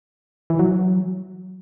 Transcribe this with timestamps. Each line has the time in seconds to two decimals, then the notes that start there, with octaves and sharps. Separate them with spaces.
0.50 E3
0.59 F#3